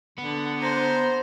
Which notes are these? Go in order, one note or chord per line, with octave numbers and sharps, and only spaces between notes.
D3 B3
C5 A#5